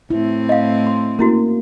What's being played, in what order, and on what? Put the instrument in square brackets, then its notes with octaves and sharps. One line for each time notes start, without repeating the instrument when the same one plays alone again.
[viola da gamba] A2 C4 [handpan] E4
[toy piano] D#5 F5
C6
[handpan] A#3 [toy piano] C#4 E4 F#4